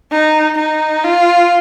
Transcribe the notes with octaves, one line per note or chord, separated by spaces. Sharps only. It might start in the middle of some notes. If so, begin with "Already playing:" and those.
D#4
D#4
F4